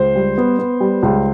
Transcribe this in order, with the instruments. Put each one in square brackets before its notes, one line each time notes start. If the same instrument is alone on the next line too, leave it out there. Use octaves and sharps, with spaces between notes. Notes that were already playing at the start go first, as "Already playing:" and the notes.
Already playing: [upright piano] C#2 [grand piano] C5
[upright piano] G3
B3
B3
G3
C#2